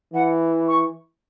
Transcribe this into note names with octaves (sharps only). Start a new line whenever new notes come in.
E3 F#5
C#6